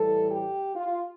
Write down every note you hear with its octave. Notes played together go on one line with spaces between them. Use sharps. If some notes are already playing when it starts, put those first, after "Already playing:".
Already playing: A2 E3 G3 A4
G4
F4